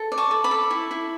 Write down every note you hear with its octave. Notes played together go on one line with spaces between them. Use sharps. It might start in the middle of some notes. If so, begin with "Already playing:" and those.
Already playing: A4
D5
A5 C#6
A4
B5 D6
A4
E4
E4